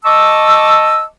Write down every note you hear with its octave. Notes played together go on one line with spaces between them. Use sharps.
D#5 A5 C#6 D6 E6